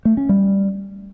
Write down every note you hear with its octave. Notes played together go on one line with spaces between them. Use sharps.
A3
C#4
G3